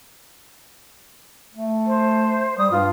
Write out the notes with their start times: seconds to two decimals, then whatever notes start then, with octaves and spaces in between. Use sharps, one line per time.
1.54 A3
1.87 C5
2.58 G3 D#6
2.71 G2 F4